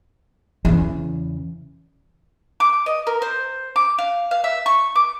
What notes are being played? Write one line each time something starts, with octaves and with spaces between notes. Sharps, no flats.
E2 C#3
D6
D#5
A#4
C5
D6
F5
F5
E5
C#6
D6